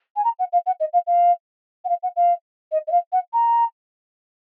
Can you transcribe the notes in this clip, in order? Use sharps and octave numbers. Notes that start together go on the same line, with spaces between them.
G#5
A#5
F#5
F5
F#5
D#5
F5
F5
F#5
F5
F#5
F5
D#5
D#5
F5
F#5
A#5